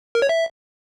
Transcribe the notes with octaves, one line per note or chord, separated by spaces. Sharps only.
A#4
C#5
E5